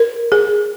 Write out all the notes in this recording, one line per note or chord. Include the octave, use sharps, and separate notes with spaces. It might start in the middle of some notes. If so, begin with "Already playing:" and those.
Already playing: A#4
G#4